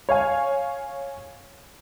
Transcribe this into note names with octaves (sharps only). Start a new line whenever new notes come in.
C#5 F5 G#5